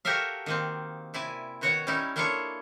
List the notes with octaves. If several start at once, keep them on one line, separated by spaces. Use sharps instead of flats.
F#4 G4 A4 A#4 E5 F5
D#3 A#3 C4
C3 E4 D5 G#5
B2 D#3 F#4 C#5 F#5
G3 C#4 D#4 E4
A#3 D4 E4 F4 A4 C#5